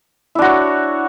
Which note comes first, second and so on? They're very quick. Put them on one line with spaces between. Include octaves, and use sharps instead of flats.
E4 D4 F#4 C#5